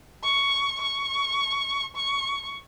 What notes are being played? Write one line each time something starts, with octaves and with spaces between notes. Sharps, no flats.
C#6
C#6
C#6